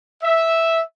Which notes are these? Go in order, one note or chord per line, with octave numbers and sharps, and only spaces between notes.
E5